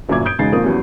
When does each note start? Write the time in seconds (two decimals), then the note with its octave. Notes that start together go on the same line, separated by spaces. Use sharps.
0.09 G1 F#2 A#2 E5 D6 G#6
0.25 D#6 G6 D7
0.39 E1 C#3 G#3 D#4 A6 C7
0.52 A#1 F2 A#3 A#4 D#6
0.64 E2 F#3 G3 C#4